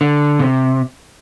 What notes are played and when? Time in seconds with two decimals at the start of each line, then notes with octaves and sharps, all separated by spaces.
0.01 D3
0.39 C3